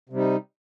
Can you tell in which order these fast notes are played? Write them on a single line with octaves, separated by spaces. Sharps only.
C3 G3 D#4